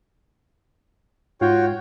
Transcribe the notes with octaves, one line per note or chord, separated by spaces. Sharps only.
G#2 F4 F#4 C#5 G5